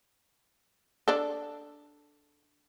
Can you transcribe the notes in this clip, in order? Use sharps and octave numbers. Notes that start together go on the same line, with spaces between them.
D4 A4